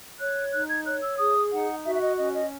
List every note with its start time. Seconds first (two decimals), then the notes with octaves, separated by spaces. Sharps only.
0.19 C#5 F#6
0.52 D#4 F#6
0.69 G#6
0.85 C#5 F#6
1.02 E6
1.18 G#4 D#6
1.51 D#4 F#5
1.84 F#4 E5
1.94 E5
2.01 D#5
2.17 C#4 D#5
2.33 D#5